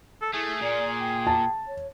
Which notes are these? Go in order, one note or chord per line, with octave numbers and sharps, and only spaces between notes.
A4
A3 E4 G#4
A#2 D5
G5
A5
C#5